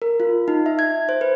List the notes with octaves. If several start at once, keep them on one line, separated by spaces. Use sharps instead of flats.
A#4
F4
D#4
E5
G#6
C5
B4